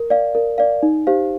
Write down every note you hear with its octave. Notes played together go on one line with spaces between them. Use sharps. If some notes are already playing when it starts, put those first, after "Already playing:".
Already playing: A#4
D5 F5
A#4
D5 F5
D#4
G4 C5 F5